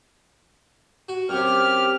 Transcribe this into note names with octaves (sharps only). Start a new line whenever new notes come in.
F#4
F#2 C3 G4 F6